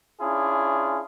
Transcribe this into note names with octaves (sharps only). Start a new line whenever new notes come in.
C#4 D4 E4 F4 G#4